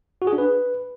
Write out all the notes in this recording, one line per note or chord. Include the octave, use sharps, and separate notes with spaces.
F#4
G#4
D4
B4